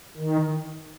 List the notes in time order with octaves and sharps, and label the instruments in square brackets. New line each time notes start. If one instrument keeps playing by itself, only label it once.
[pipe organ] D#3